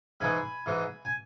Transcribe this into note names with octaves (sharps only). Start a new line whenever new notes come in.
G#2 E3 G#3 G#5 B5
G#2 E3 G#3
G#5